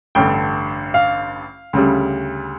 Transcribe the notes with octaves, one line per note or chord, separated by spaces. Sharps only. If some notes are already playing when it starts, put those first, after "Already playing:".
A1 G2 D3 G5
F5
D2 C#3 G3